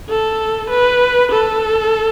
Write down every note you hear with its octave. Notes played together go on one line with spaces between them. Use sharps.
A4
B4
A4